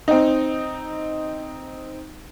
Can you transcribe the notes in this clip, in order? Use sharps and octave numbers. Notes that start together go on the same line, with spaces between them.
C4 D#4